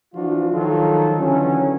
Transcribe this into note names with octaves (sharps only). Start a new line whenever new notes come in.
E3 F3 D4 F4 F#4
D#3 F3 F#3 F4 A4
D3 E3 F#3 C#4